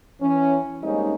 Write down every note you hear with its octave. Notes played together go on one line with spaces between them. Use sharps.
E3 C#4
G3 G#3 A#3 C4 C#4 D#4